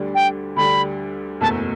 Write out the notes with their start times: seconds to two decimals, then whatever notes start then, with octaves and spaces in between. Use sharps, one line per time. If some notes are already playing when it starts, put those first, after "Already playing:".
Already playing: D2 D3 G3 D4 G4
0.15 G5
0.56 D2 D3 G3 D4 G4 B5
1.41 F#1 E2 B2 A3 A5